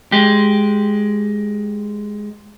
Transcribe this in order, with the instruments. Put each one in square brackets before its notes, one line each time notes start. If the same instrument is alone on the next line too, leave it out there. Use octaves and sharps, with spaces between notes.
[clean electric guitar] G#3 G4